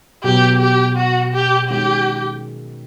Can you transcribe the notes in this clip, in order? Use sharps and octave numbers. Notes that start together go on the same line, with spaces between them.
B2 F#3 B3 G4
G4
F#4
G4
D#3 G#3 C#4 F#4 G4